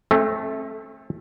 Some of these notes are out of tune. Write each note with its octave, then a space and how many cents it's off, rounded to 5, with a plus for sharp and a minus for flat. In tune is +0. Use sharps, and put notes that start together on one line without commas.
A3 -10 C4 +40 E5 +35